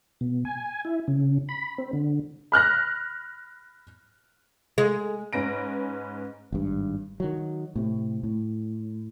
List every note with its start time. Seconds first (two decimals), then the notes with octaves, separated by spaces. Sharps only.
0.21 B2
0.45 G#5
0.85 E4
1.08 C#3
1.49 B5
1.78 C4
1.93 D3
2.52 B5 F6 F#6 A#6
4.78 G#3
5.33 G#2 C#4 B4 A#6 D7
6.52 G#1 G2
7.20 D#3 F#3
7.76 A2 C3
8.23 A2